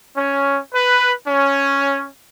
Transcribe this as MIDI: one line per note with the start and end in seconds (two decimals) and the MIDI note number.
0.15 0.58 61
0.72 1.11 71
1.27 2.06 61